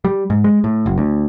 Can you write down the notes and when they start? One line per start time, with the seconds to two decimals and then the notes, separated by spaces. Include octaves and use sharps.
0.05 G3
0.30 G#2
0.44 G#3
0.64 A2
0.86 F#1
0.98 D2